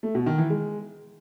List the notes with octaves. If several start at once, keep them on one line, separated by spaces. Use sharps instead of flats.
A3
B2
D#3
E3
G#3